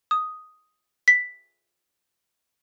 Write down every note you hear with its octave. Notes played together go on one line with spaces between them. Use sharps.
D#6
B6